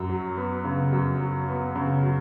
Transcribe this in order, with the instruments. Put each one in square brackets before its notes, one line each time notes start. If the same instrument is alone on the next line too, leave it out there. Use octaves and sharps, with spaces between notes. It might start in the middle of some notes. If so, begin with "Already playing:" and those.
Already playing: [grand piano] F#2
F#3
B3
C#3
F#2
F#3
B3
C#3
F#3